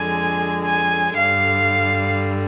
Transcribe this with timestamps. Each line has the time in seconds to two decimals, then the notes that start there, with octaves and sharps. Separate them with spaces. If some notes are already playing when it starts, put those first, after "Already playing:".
Already playing: F2 D3 G#3 G#5
0.65 G#5
1.18 G2 D3 G3 F5